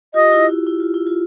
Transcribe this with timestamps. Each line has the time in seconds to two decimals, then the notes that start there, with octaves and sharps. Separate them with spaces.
0.14 F4 G4 D#5
0.31 E4 F#4
0.49 E4
0.67 E4
0.80 F4
0.94 E4
1.06 F4